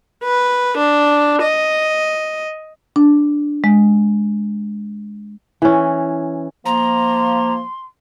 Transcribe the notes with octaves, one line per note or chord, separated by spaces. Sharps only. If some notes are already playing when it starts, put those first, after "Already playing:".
B4
D4
D#5
D4
G#3
E3 C#4
F3 A#3 A#5 C6